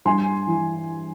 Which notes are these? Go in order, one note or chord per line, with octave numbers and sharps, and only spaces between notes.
G2 G#5 C6
E3